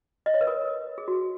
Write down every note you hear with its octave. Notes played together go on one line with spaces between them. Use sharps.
D#5
C#5
B4
A#4
G#4
F#4